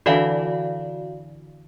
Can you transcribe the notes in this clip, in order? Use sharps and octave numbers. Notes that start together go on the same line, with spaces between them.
D3 E3 E4 F#4 D5 F5